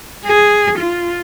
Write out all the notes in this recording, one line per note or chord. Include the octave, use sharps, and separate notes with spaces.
G#4
F4